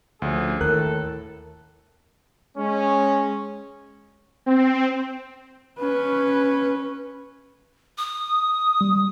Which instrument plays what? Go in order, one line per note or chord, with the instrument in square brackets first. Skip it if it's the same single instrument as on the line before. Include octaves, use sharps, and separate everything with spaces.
[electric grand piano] D2 [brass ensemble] F3 C#4 G#4
[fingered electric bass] D#2 [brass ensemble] A2 A4 [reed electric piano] A#4 [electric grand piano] F#6
[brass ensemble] G#3 C#4
[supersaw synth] C4
[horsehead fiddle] C#4 B4
[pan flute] D#6
[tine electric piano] G3